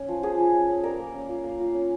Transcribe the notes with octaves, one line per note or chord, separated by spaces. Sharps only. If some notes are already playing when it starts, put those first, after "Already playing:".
Already playing: C#4
F3
F3 G#4
F3
C#4
C#4
G3 A#4
A#3
C#4
F4
A#3
F4
C#4